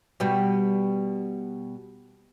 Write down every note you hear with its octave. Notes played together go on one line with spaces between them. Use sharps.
B2 G3